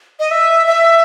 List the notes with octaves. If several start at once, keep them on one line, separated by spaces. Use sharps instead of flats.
D#5
E5
E5